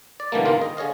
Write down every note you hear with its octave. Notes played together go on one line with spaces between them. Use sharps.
D5
B2 D3 E3 G3 A3 A#3
G#1 C#2 D#3 A#3 F4
D#5
D3 G#4 C#5 D#5 F5